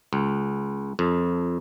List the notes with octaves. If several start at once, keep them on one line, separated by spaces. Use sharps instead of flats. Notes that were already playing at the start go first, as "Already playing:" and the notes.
C#2
F2